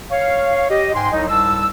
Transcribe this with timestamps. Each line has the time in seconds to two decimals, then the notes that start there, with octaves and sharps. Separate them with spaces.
0.10 C#5 F5
0.68 G4 D#5
0.94 G#2 G5 G#5 C6
1.12 C2 F#3 D#4
1.29 C2 G#2 A5 E6